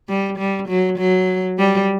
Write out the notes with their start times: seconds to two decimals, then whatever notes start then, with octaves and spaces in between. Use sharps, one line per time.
0.09 G3
0.39 G3
0.68 F#3
0.99 F#3
1.59 G3